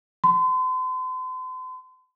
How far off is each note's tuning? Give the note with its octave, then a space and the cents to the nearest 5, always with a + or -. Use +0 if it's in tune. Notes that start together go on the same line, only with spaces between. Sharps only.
C6 -40